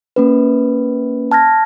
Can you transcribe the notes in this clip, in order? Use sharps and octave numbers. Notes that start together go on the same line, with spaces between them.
A#3 C#4 B4
A5 F6 G#6 A#6